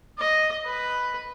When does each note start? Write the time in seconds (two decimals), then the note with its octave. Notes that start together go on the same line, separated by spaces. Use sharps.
0.18 D#5
0.65 B4